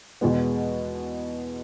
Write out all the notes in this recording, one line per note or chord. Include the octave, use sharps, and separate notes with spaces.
E2 B2 G#3 B3